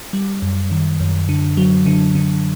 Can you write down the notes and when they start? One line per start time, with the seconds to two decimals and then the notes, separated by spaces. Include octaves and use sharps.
0.13 G3
0.42 F#2
0.71 D#3
1.00 F#2
1.29 D3
1.57 F#3
1.86 D3
2.15 D3